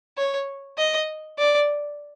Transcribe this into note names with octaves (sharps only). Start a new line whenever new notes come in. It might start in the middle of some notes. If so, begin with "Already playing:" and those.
C#5
D#5
D5